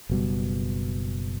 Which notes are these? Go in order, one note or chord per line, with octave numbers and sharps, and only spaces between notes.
F#1 B2 G3